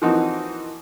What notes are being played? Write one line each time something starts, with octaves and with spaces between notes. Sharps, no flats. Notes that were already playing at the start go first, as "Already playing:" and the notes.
E3 F3 A#3 C4 D#4 F#4